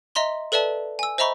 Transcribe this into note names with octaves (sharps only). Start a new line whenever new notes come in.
D#5 E5 A#5 C6 G7
A4 B4 D5 E5 A5
G#5 E6
C5 D#5 E5 A#5 B5 C#6